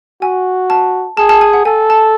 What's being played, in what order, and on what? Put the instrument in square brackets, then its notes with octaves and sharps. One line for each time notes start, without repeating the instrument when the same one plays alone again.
[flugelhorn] F#4 [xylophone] G#5
[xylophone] A5
[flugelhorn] G#4 [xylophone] A5
[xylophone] A5
G#5
F#5
[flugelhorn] A4 [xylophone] G#5
[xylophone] A5